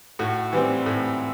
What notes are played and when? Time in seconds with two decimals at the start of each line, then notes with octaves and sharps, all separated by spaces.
0.19 A2 F#4
0.53 E3 G3 C4
0.86 A2